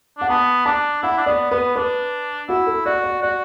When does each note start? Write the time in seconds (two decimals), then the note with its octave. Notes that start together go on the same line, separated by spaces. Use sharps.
0.18 D4 F#5
0.29 B3 A5
0.66 D4 A5
1.03 E4 F#5
1.18 D4
1.26 B3 D5
1.51 B3 B4
1.76 D4 B4
2.49 E4 F#4
2.67 A4
2.85 F#4 D5
3.04 D5
3.22 F#4 D5